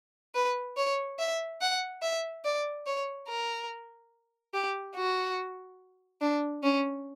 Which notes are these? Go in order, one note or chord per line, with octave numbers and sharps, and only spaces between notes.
B4
C#5
E5
F#5
E5
D5
C#5
A#4
G4
F#4
D4
C#4